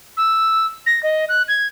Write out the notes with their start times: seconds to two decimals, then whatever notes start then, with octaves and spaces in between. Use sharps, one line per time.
0.17 E6
0.86 A#6
1.03 D#5
1.29 F#6
1.48 G#6